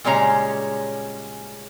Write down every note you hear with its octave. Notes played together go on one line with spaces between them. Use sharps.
A#2 C#3 G3 G#3 C#4 A#5